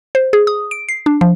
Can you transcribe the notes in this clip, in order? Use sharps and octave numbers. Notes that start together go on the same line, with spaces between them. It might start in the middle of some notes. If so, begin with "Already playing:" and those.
C5
G#4
D#6
D7
C7
D4
F3